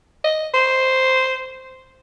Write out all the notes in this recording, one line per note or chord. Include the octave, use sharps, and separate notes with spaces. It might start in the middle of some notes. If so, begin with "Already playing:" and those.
D#5
C5